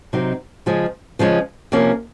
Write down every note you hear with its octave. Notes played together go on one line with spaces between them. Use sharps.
C3 F#3 C4 D#4
C#3 F3 G#3 C#4
C#3 F3 G#3 C#4
C3 F3 A#3 C#4